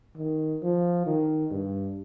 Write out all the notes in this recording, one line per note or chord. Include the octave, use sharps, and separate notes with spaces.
D#3
F3
D#3
G2